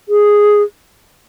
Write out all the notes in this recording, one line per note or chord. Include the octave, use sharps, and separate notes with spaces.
G#4